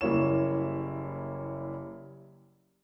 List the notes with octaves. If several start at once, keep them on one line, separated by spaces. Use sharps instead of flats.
F#1 G3 A#3 E4 C#5 E7